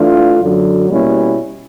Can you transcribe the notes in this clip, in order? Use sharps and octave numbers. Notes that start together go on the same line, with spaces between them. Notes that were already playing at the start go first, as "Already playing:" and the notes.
Already playing: E3 A3 D4 F4
F#2 D3 F#3
B2 G3 A#3 C#4 E4